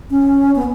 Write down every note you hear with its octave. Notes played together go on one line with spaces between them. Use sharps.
C#4
B3